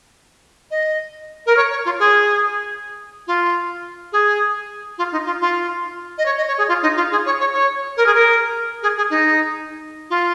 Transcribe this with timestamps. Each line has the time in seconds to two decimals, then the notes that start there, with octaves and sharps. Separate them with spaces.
0.71 D#5
1.46 A#4
1.56 C#5
1.70 C#5
1.85 F4
1.99 G#4
3.27 F4
4.12 G#4
4.98 F4
5.12 D#4
5.25 F4
5.41 F4
6.18 D#5
6.25 C#5
6.37 D#5
6.47 C#5
6.58 G#4
6.68 F4
6.82 D#4
6.96 F4
7.11 G#4
7.25 C#5
7.40 C#5
7.53 C#5
7.97 A#4
8.06 G#4
8.14 A#4
8.82 G#4
8.97 G#4
9.10 D#4
10.10 F4